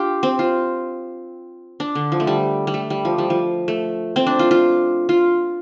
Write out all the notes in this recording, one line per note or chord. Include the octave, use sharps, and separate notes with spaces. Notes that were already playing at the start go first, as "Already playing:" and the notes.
Already playing: D4 F4 G4
C4
F4
D4
D3
F3
A3
G3
G3
A3
G3
F3
G3
F3
A3
C4
D4
F4
F4
F4